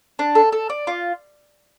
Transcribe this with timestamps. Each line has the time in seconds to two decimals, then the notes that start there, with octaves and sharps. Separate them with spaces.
0.19 D4
0.35 A4
0.52 A4
0.70 D5
0.87 F4